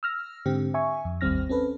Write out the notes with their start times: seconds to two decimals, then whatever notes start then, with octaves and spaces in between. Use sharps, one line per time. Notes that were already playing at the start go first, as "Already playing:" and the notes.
0.03 E6 F6 A#6
0.45 G#2 D3 C4 G4
0.74 E5 G#5 C#6
1.05 F2
1.21 G#1 D#2 G3 C4 F6 A#6
1.49 C4 C#4 A4 B4